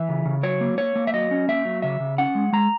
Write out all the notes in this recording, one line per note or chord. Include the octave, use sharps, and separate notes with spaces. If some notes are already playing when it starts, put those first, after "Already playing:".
Already playing: E3 E5
C#3
C#3
F#3 C#5
A#3
A#3 C#5
A#3
E5
F#3 D#5
C#4
A#3 E5
F#3
C#3 E5
C#3
C#4 F#5
G#3
G#3 A#5